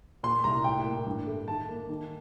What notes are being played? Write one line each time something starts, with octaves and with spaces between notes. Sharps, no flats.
A#2 C6
C2 A#5
A2 G5
A#3
G2
A3
D#3 A5
A#3
D#3